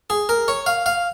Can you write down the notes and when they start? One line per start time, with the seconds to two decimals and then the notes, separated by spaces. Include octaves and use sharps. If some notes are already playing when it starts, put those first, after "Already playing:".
0.10 G#4
0.29 A#4
0.48 C#5
0.66 F5
0.86 F5